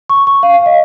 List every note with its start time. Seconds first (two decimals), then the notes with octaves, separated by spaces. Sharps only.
0.09 C#6
0.27 C#6
0.43 F5
0.54 F5
0.66 D#5